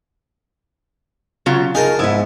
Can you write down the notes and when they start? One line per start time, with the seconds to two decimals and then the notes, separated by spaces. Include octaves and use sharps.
1.46 C#3 F#3 F4
1.75 D#4 G#4 A#4 A5
1.99 G#2 B3 E4